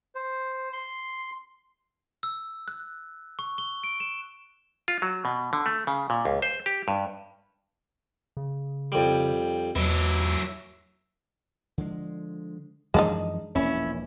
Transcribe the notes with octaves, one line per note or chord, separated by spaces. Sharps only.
C5
C6
E6
F#6
C#6
G7
D7
E7
F4
F#3
B2
D3
A3
C#3
A#2
C#2
C5
G4
G2
C#3
F2 G3
E2 B2 F#3 E4
D3 F3 G#3
F#2 E3 F3 G#3 D4 D#4
E1 A#1 A#3 C#4 E4